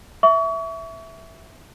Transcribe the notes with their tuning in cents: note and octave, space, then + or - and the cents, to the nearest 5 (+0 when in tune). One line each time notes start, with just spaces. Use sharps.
E5 +0 C#6 +35